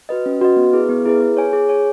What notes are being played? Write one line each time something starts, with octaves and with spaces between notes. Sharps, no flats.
F#4 B4 D#5
C#4
F#4 B4 D#5
B3
E4 G#4 B4
B3
E4 G#4 B4
G#4
C#5 G#5
G#4
C#5 G#5